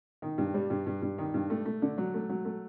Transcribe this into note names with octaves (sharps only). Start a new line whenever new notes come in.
D#3
G2
G3
G2
G2
G2
D#3
G2
A3
A3
D3
F#3
A3
F#3
A3